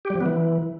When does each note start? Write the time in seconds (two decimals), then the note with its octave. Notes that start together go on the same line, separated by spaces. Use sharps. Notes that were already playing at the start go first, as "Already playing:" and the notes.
0.05 G4
0.10 G3
0.15 F3
0.21 B3
0.26 E3